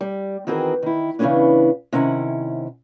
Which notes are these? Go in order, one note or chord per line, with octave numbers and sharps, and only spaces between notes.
G3
D#3 E3 C4 F#4 G#4 A#4
D#3 E4
C#3 E3 G3 B3 C#4 D4
C3 D#3 C#4 E4 F#5